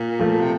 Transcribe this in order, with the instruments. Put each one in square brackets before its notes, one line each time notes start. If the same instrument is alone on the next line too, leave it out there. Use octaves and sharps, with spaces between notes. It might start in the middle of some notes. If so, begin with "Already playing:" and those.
Already playing: [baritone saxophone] A#2
[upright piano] F3 A3
[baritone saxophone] C3